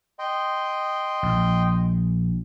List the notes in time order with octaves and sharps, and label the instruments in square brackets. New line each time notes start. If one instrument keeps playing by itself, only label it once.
[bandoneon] D#5 G5 C6
[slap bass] A#1